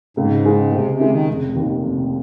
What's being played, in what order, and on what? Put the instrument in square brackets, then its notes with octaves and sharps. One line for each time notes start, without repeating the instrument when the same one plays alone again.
[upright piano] C#2 [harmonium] G#2
[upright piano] C#3 G#3
[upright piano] C#2 [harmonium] C3
[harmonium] C3
[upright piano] C#3 G#3
[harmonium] D#3
[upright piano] F1
D#2 D#3
F1